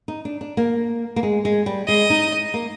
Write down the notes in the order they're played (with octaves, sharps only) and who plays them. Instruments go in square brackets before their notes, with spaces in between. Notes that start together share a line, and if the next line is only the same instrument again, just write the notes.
[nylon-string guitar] D#4
D4
D4
A#3
A#3
G#3
G#3
G3
[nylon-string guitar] G#3 [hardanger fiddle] D#5
[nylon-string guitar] D#4
A#3